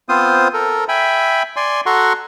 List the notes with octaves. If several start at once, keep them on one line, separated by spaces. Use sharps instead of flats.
B3 C4 F4 C5 D#6
A4 A#4
E5 G5 G#5 B5
D5 G#5 C6
F#4 A4 F#5 A#5 C6 C#6